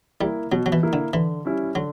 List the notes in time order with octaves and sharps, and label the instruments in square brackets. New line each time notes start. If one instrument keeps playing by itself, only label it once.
[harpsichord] G3 [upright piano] A#3 E4
[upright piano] B2 [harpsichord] F#3
[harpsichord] F#3
E3
[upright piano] A#3 E4
[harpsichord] D3
[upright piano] D3 [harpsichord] E3
[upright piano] G3 C#4 E4
[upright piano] D3 [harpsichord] F#3